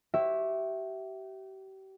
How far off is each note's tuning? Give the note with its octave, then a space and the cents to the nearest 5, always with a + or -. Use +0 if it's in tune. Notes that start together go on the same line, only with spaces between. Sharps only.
G4 -35 C#5 -40 E5 +0